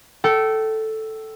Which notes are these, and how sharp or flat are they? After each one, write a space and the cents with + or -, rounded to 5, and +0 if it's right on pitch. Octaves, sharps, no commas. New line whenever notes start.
A4 +0 G5 -30